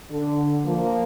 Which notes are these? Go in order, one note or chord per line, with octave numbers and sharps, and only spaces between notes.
D3 D4
F3 A#3